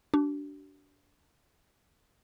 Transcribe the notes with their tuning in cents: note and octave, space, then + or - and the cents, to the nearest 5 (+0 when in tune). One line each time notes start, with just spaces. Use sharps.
D4 -15 F#4 +45